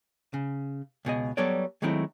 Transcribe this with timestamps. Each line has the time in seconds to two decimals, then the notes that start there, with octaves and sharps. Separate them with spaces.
0.34 C#3
1.05 C#2 B2 G#4 D#5
1.37 F#3 G3 B3 A4 C#5 D5
1.82 D#3 F#3 G#3 A3 C4 E4